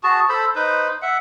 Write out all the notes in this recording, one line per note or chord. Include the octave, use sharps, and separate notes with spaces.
F#4 G#4 A5
A4 C5 B5 E6
D#4 B4 C5
E5 F#5